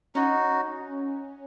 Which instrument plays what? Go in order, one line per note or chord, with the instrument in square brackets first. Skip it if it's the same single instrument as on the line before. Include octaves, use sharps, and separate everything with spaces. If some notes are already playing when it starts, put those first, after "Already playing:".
[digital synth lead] C#4 [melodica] D#4 F#4